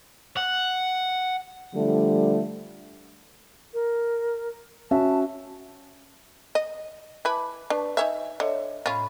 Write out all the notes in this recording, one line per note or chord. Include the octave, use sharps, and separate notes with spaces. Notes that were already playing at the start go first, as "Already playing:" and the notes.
F#5
D3 F3 G3 A3
A#4
C#4 F#4 E5 A5
D#5
E4 B4 G#5 A5 D6
D4 B4 A5 C#6
D#4 C#5 E5 G#5
D3 C#5 D#5 E5
A2 C#4 F4 B5